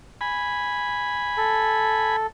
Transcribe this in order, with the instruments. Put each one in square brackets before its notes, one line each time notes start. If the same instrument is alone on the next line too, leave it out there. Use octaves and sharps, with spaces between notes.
[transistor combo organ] G#5 B5
[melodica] A4